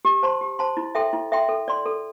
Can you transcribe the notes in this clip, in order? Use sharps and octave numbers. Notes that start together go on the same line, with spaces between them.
G4
C5 A5 C6
G4
C5 A5 C6
E4
A4 E5 G5 C6
E4
A4 E5 G5 C6
A4
D5 C6
A4